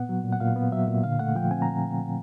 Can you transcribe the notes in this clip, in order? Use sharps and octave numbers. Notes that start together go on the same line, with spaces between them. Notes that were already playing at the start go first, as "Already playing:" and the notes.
Already playing: A#2 B3 F#5
F#3
A#2
F#5
A#2 F5
B3
F#3 E5
A#2
D3 F5
A3 F#5
F3 G5
C4 G#5
A#5